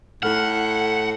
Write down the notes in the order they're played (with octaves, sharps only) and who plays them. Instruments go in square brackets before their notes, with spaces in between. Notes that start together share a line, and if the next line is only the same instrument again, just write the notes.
[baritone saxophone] A2 [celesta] E4 A4 F6 [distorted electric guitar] F#5